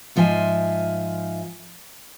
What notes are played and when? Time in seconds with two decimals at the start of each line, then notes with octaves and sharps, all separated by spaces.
0.16 G#2 F3 F4 E5 G#5